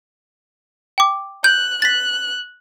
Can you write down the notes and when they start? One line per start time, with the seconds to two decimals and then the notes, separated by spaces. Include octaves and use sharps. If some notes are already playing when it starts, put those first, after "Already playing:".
0.98 G5 D6
1.44 F#6 G6
1.82 F#6 A6 B6